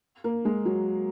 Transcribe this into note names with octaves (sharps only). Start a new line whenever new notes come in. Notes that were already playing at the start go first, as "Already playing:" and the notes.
A#3
G#3
F#3